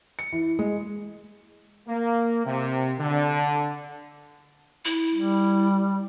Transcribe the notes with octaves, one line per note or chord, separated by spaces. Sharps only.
C#7
E3
G#3
A#3
C3
D3
E4
G3